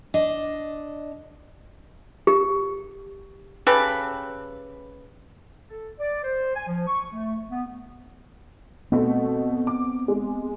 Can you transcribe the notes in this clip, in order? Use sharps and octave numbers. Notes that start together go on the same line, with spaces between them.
D4 D#5
G4
C#3 G4 A4 B4
A4
D5
C5
G#5
F3
C#6
A3
B3
B2 A3 B3 C4
D6
G#3